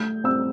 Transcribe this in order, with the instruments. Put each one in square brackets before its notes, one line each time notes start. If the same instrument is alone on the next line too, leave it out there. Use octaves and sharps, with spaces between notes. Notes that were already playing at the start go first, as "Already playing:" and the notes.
Already playing: [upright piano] A3 G6
C4 E6